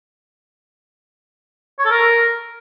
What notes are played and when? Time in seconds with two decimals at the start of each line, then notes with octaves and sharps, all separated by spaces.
1.79 C#5
1.85 A4
1.91 A#4